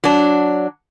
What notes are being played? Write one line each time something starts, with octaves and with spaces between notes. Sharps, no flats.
F#3 D4